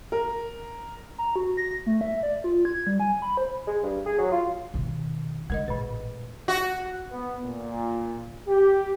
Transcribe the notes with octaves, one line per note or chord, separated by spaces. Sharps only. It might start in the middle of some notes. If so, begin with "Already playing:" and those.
A#4
A#5
F#4
A#6
A3
E5
D5
F4
G#6
G3
G#5
B5
C5
G#3
G2
G#4
F#3
F4
B2 D#3
D3 G#3 A#4 D#5
A1 A#2 B4
F#4
B3
A#2
G4